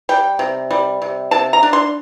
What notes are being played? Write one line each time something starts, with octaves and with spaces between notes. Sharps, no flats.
G3 G5
C3
G3
C3
C3 A5
A#5
D4
C6